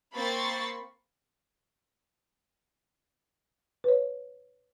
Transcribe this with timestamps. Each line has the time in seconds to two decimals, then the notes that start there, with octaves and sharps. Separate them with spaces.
0.14 A#3 C4 B5 C#6 A6 C7
3.84 B4 C#5